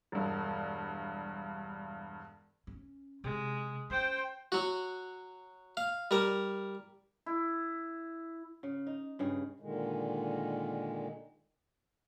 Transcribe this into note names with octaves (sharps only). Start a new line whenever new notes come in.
E1 G2
C#4
C3 G#3
C#4 C5 G5
F#3 F#4
F5
G3 A#4
E4
C#3
D#4
G2 C#3 G#4
A#2 D3 D#3 G#3